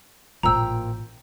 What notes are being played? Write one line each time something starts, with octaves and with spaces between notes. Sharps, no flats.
A1 A#2 F3 A#3 G5 A#5 E6